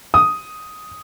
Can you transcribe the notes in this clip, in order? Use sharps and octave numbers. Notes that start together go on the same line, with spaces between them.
D#6